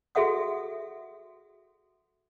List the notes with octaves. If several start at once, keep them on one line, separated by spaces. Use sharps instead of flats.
F#4 G#4 A4 E5 F#5 D#6